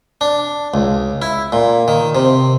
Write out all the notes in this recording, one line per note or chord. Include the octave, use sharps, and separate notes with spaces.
D4
C#2
E4
A#2
D#3
C3